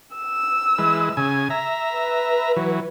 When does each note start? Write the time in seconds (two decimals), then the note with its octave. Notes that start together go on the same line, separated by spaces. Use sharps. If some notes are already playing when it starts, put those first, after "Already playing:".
0.16 E6
0.78 E3 G#3 B4
1.17 C#3 G#5
1.50 E5 A#5
1.94 B4
2.57 E3 F#3